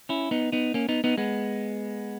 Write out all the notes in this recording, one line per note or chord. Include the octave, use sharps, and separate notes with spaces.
C#4 E4
B3 D#4
B3 D#4
A#3 C#4
B3 D#4
B3 D#4
G#3 B3